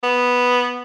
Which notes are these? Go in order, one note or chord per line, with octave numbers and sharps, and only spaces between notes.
B3